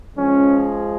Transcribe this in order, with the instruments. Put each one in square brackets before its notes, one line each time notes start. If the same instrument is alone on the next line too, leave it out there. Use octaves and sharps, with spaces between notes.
[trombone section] F3 G#3 [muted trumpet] C#4